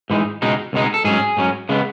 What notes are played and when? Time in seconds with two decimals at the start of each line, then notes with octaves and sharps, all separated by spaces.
0.10 G#2 E3 G#3 D#4
0.42 C#2 B2 G#3 D#4
0.73 C#2 B2 G#3 D#4
0.94 A4
1.05 G#2 F#3 C#4 G#4
1.37 G#2 F#3 C#4
1.69 C#3 G#3 B3